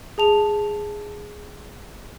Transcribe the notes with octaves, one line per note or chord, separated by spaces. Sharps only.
G#4 A5 F7